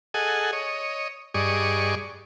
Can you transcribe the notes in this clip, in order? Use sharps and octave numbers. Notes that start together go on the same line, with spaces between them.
G#4 A4 D#5 F#5 G#5
C#5 D#5
G2 G#4 D5 D#5 C#6